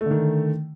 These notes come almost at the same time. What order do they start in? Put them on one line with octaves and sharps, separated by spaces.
A3 D3 D#3